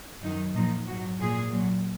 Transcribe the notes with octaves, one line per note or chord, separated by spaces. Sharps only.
F#2 D#3 F#3 D#4
A#2 F3 D#4
G#2 F#3 F#4
A#2 F3 G#4
A#2 F#3